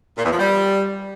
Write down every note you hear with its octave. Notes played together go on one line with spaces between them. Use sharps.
A#2
E2
F3
G3